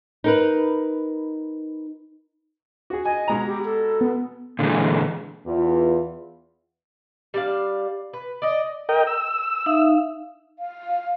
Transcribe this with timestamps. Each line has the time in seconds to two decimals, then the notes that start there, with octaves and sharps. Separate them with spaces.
0.24 D#4 A#4 B4
2.90 F#4 G#4
3.05 D#5 G#5
3.28 B2 G#3 A#5
3.47 G4
3.65 A4
4.01 B3
4.59 A#2 D3 E3 G#3
5.46 E2 F4
7.34 G3 D4 F5
8.14 B4
8.42 D5 D#5
8.89 A#4 D#5 G5
9.07 E6
9.66 D#4 E5 F5
10.59 F5